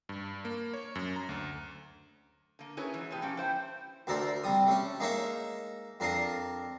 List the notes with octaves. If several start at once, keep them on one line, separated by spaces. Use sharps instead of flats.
G2
A#3
C#5
F#2
A#5
D2
D3 A#3
C#4 E4 G#4 A#4 B4 C#5
G#2 E3 F#3
B2 G#3 B3 G4
F3 A#3 C#4 G4
E4 C5 E5 G5
D2 A4 A#4 D5 C6
C3 G3 D#6
A3 C#4
G#3 A#3 D#4 C#5 E5
F2 D4 A#4 F5 C6 D#6